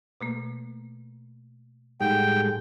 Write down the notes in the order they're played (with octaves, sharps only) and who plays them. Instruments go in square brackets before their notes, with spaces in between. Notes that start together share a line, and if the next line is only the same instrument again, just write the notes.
[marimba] B2 A3 A#3
[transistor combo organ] A2 G3 G#3 [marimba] D#4 F#5 [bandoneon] G5